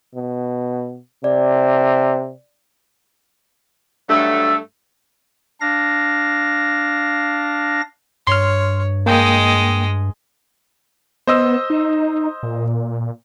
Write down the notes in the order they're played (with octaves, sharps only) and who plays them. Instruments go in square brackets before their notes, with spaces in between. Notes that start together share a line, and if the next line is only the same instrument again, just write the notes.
[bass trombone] B2
[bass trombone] C3 [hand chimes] D5
[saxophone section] G2 F#3 A3 [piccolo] E6
[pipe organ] D4 F5 A#6
[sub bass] G2 [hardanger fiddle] C#5 [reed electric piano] C6 F6
[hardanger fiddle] G#3 D#5 [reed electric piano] A#3 G5
[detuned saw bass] B3 [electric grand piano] C5 D#5 E6
[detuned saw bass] D#4
A#2